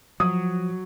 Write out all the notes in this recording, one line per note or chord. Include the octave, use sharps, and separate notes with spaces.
F3 F#3 D#6